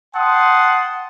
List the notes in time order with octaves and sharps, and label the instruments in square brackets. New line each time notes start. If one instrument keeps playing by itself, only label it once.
[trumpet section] F#5 G5 A5 C6 D#6